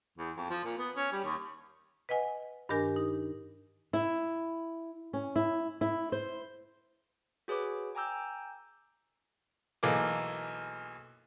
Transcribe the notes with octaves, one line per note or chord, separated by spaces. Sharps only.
E2
F2
F3
A#2
B3
C#4
G3
D#2
B4 D#5 F#5 G#5
G2 D#3 D4 G4 A#4 G#5
D#4
E4
C#4
E4
E4
C5
F#4 G#4 B4 C#5 D6
G5 G#5 A#5 D6 E6 G6
B1 E3 A3 A#3 G#4 D6